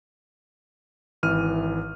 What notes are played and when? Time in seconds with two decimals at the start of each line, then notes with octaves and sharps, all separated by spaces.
1.23 G#1 E3 F6 D#7